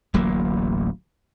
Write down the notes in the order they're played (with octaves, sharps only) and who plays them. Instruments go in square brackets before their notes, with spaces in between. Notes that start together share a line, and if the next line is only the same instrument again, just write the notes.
[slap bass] D1 A1 F#3 A#3